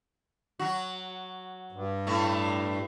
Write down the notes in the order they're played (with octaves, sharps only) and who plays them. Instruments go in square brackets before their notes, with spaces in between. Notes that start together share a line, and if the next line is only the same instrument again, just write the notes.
[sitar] F#3 F#4
[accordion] G2
[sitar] A2 A3